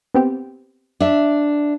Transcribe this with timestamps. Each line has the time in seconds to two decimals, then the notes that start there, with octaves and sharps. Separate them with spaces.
0.14 B3 C4 G4
1.00 D4 E5